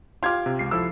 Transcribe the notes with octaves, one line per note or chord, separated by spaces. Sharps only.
F4 G4 F5 C6 D6 G#6
C3
C#2 C7
F3 E4 A4 E6